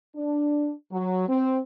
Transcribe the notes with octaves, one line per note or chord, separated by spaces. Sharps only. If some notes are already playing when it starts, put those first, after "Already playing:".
D4
F#3
C4